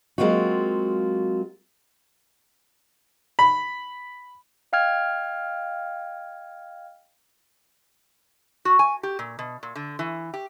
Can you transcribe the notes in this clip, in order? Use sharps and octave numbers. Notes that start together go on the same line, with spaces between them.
F#3 G#3 A#3 C4 F4 F#4
B5
D#5 F5 G5 F6 G#6
F#4
G#5
G4
A#2
B2
A#2
D3
E3
G4